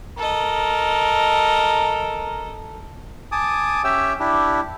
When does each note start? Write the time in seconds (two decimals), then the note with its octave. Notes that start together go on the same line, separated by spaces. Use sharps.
0.18 A4 A#4 D#5
3.32 G#5 A5 D6 D#6
3.84 C#4 G4 C#5 E5 G5 E6
4.20 D4 E4 G4